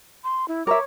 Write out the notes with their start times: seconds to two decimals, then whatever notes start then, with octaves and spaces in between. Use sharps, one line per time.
0.24 C6
0.48 E4
0.67 A#4 C#5 E5 D6